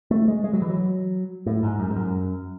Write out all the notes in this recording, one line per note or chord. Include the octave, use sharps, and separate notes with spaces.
A3
G#3
G#3
F#3
E3
F#3
A2
G#2
F#2
G#2
F#2